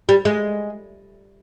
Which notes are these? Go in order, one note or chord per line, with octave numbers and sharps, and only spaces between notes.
G3
G#3